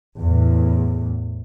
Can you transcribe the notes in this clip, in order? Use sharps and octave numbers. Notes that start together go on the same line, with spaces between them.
E2 A2